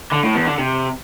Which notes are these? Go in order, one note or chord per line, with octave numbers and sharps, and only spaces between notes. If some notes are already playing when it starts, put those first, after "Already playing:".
D3
A2
E2
D3
C3